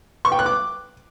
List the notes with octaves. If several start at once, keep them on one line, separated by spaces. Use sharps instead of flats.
C#6
G5
F#6
D6